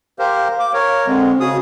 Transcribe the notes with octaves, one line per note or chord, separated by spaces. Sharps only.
G4 A#4 C5 F5
D6
A#4 C#5
D3 G#3 C4
C#3 F#4 G#4 D#6